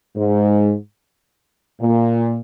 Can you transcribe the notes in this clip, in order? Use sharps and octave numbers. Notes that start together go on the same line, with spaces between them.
G#2
A#2